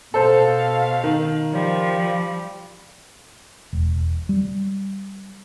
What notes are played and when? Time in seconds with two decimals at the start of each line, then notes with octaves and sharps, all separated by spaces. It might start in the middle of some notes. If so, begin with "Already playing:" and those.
0.14 B2 A4 C5 F5
1.04 D#3
1.52 F3 G3
3.73 E1
4.29 G3